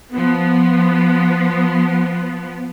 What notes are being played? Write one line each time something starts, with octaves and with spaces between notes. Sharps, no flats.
F3 B3